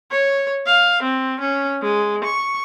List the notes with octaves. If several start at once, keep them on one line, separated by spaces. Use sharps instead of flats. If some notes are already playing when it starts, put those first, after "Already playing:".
C#5
F5
C4
C#4
G#3
C#6